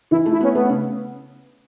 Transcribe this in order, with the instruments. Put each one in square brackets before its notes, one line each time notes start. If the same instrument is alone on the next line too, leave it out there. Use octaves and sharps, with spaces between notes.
[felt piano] E3 [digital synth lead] E4
[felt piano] A3
[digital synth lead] E4
[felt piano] B3 [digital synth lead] C#4
[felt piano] A3 [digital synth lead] B3
[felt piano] C#3